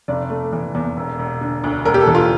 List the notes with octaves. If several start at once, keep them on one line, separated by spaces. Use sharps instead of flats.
F1 D5
A3
E3
E2
E1
E1
D3
D2
E1 A#4
G4
A4
E3
F4